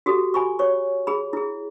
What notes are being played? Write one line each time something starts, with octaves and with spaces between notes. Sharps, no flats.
F#4 G4 A4
G#5 B5 C#6
C#5 C#6
G#4 B5
E4 G#4